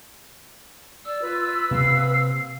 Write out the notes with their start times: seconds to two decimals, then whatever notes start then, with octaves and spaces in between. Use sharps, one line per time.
1.06 D5 E6
1.22 F4 B4
1.71 C3 A#3 F5